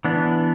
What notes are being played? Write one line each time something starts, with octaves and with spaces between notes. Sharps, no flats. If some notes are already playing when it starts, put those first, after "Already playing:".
E3 B3 D4